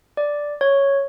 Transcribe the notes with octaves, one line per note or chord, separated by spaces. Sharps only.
D5
C#5